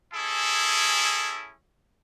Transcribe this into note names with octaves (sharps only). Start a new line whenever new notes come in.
C#4 E4 G#4 A4